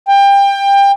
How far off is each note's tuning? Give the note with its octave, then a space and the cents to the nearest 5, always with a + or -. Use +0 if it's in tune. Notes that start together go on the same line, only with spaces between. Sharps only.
G5 +25